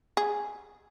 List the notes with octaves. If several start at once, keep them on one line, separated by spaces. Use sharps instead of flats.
G#4